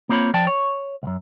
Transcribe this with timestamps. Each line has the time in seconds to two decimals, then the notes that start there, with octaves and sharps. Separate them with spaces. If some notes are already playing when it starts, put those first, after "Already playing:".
0.09 A#3 C4 F4 C#5 B5
0.34 F3 D5 G5 A5
0.47 C#5
1.03 C2 F#2